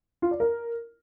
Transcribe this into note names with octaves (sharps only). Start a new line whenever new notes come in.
F4
D5
A#4